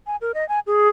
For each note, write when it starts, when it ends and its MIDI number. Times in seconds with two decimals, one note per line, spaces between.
0.07 0.16 80
0.21 0.32 70
0.34 0.47 75
0.49 0.60 80
0.67 0.89 68